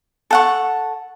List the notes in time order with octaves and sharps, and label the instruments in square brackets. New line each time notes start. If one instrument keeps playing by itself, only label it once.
[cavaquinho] A4 F#5 C#6